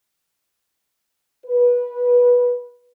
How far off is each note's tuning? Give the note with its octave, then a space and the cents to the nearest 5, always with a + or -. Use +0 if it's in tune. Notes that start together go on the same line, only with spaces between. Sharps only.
B4 -15